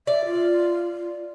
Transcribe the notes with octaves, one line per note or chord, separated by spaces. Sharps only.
D5 E5
F4